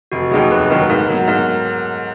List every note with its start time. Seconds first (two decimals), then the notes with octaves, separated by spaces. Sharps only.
0.12 F1 F#4
0.31 D#2 D#3 F#3 G#4
0.50 F1 B4
0.61 B4
0.70 D#2 D#3 F#3 A#4
0.89 G#2 A#4
1.09 F#3 B3 A#4
1.28 G#2 A#4